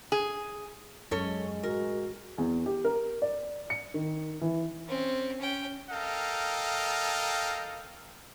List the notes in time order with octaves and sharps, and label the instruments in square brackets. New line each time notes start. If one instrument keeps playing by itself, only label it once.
[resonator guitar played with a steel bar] G#4
[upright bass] F#2 [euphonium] G#3 [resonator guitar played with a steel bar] C#4 A4 C#5
[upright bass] A1 [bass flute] F#4 [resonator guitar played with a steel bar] A#4
[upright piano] E2
G4
A#4
D5
C#7
D#3
E3
[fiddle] C4 C#4
C#4 G5
[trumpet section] A4 A#4 D#5 F5 G5